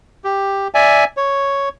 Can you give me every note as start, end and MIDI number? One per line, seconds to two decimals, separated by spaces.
0.24 0.68 67
0.74 1.04 74
0.74 1.04 76
0.74 1.04 80
1.17 1.69 73